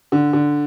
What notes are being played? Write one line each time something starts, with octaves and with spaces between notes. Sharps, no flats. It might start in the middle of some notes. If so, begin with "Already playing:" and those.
D3
D3